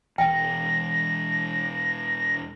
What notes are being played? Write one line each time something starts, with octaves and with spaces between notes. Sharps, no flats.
E1 E2 G5 A#6